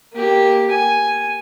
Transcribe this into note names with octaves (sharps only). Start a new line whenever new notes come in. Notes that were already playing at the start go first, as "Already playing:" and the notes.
A#3 G4
G#5